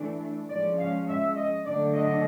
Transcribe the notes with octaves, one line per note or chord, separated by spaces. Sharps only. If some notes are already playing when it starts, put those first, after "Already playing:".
Already playing: E3 A3 D4
F3 G#3 C#4 D5
F5
E5
D#5
D3 F#3 A3 D4 D5
D#5